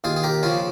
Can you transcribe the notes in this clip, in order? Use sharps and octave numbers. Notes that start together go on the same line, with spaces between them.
D#2 F4 G#4
G#4
G4 A#4
C#3 F3 F4 G#4